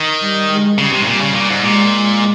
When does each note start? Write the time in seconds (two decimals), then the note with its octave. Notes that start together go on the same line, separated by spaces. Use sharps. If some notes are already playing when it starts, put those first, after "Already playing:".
Already playing: D#3
0.22 G3
0.51 G#3
0.78 C#3 G3
0.93 C3
1.01 G#2
1.06 A#2 G3
1.21 C#3
1.35 A#2
1.49 G#2
1.63 A#2 G#3